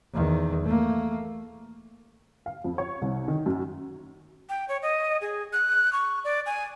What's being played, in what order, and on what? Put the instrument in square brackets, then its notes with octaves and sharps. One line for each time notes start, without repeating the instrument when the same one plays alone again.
[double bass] E2 D#3
A3 A#3
[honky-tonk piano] F5
F2
C#5
C2
D#3
F#2
[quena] G5
C#5
D#5
G#4
F#6
C#6
D5
G#5